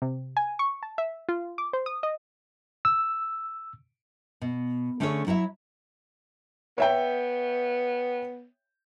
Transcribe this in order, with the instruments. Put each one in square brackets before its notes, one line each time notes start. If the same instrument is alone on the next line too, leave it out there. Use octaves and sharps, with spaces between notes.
[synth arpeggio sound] C3
G#5
C#6
A5
E5
F4
D6
C5
D#6
D#5
[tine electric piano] E6
[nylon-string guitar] B2
D3 A3 C#4 G#4 A4 C#5
F#3 E4 C#5 E5
[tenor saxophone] B3 [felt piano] C#5 E5 G5